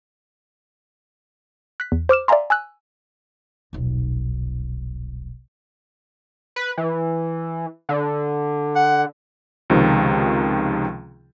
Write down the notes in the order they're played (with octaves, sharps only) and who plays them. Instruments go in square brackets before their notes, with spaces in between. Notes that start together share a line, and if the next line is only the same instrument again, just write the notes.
[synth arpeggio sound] F#6 B6
E2
C5 D6 F6 E7
D5 E5 F5 G#5 A#5 C6
G#5 E6 F#6
[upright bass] D#1 B1
[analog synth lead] B4
E3
D3
[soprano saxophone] F#5
[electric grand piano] C#2 C3 D#3 F3